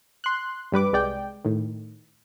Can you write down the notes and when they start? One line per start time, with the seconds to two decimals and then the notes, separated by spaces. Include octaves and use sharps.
0.24 C6 F#6
0.72 G2 G3 B4 D6
0.93 C2 G#3 D5 G5
1.45 A2 D#3